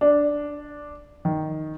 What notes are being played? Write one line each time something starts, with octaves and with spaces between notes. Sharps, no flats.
D4
D#3